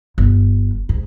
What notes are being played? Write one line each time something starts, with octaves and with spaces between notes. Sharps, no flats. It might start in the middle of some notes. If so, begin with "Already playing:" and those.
G1
G#2